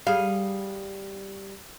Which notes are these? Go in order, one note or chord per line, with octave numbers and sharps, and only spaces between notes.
G3 G#4 F5